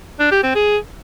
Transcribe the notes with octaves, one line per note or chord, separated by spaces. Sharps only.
D4
G4
C4
G#4